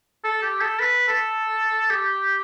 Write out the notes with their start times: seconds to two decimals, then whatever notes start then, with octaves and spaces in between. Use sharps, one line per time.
0.24 A4
0.43 G4
0.61 A4
0.80 B4
1.08 A4
1.90 G4